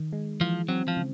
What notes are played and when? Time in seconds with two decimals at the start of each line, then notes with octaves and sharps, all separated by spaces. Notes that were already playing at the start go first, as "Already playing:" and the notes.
Already playing: D#3
0.13 G#3
0.40 E3 F3
0.68 F#3 C4
0.88 F3
0.97 C#3